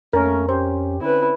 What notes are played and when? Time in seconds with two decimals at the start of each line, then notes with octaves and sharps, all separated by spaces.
0.13 F2 A3 A#3 C#4 A#4
0.49 C#4 G4 C5
1.01 D3 C4 C#4 E4 B4